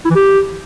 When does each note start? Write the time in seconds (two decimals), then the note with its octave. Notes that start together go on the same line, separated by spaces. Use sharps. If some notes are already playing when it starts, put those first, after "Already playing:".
0.05 E4
0.10 E3
0.15 G4